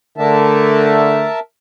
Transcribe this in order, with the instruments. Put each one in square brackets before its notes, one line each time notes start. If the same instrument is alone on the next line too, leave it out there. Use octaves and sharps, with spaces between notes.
[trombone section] D3 A3 [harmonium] A#4 E5 A5